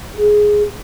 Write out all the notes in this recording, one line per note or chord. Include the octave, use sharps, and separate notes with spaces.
G#4